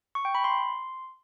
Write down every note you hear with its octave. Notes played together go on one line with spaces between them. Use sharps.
C#6
G5
B5
C6